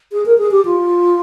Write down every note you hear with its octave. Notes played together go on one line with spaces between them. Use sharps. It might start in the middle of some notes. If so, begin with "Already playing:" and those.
G#4
A#4
G#4
G4
F4